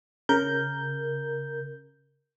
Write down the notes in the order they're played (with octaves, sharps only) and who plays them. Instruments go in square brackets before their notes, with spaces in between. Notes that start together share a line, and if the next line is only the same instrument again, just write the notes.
[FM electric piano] C#3 A#4 G6